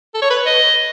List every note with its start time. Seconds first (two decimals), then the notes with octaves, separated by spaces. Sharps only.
0.14 A4
0.22 C#5
0.30 B4
0.46 D#5